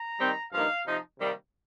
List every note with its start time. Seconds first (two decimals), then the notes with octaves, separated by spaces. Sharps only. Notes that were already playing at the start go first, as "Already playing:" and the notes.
Already playing: A#5
0.20 D#3 G3 C4 D#4
0.52 G2 F3 A#3 D#4 F5
0.86 C3 F3 D#4
1.19 C3 D#3 G3 A#3